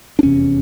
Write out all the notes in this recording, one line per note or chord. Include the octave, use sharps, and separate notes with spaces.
D4
F1 E2 C3 C#4